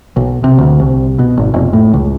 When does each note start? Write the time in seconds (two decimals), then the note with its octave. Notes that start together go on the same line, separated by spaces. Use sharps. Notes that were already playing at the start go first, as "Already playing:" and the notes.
0.16 B1
0.44 C3
0.58 D2
0.80 C2
1.19 B2
1.37 G#1
1.54 F1
1.73 A2
1.94 C#2